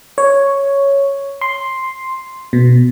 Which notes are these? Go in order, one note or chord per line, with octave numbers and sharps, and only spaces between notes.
C#5
C6
B2